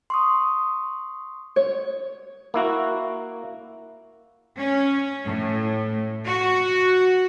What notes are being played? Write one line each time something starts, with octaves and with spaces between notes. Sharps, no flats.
C6 C#6 D#6
C#5
A#3 E4 F#4
C#4
A2
F#4